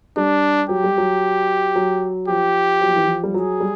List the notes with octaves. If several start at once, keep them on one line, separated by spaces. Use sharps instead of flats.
G3 D4
F#3 G4
G3
F#3
F#3
F3 G4
F#3
F3
E3
F3
G3
F#3 G#4
G3